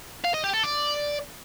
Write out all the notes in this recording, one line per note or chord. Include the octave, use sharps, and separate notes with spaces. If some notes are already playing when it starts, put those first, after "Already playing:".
F5
D#5
G4
A4
D5